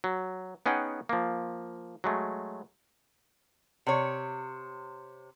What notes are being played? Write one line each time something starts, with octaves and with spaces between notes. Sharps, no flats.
F#3
B3 C#4 D#4 G#4 F#5 G5
F3 A#3
F#3 G#3 A3
C3 C#5